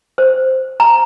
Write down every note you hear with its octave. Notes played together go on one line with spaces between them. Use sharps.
C5
A#5